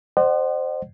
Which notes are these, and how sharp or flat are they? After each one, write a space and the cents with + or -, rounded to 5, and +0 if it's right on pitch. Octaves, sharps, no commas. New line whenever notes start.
C5 +0 D#5 -45 F#5 +25